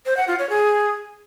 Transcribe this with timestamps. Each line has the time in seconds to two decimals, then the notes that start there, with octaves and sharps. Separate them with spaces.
0.06 C5
0.17 F#5
0.28 F4
0.39 C#5
0.50 G#4